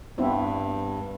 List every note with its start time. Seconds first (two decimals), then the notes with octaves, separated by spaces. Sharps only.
0.18 G2 B3 C4 E4